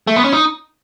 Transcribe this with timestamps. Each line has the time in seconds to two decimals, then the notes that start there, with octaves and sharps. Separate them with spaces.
0.07 A3
0.16 B3
0.24 C#4
0.33 D#4